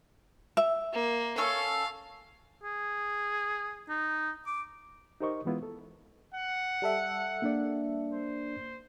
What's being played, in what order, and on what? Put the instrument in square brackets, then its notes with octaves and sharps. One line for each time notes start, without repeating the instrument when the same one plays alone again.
[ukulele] E5
[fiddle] A#3
[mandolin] C#4 A4 C#6 [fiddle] F5
[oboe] G#4
D#4
D6
[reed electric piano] D#4 G4 A#4 C5 D#5 C#6
E3 G#3 B3 E4 F4
A4
[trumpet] F#5
[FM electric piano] G3 A4 E5
[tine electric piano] A#3 D4 D5
[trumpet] C5